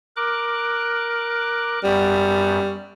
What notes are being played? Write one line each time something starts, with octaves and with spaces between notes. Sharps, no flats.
A#4 D6 F#6
F#2 G3 B3